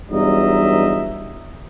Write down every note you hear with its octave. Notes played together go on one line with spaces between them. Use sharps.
E2 G2 F#3 D#4 D#5 E5